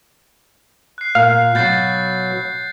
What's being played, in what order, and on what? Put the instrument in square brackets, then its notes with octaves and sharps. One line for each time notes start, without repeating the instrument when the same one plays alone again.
[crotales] F#6 C7
[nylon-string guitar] A#2 [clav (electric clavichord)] F5
[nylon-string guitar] B2 F#3 [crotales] G6 A6 C7